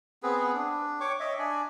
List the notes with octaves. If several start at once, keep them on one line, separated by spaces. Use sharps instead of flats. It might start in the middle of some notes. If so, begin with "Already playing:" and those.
B3 C4 G#4 B4
D4
C#5 G5 C#6 D6
C#5 D#5 E5
D4 D5 G#5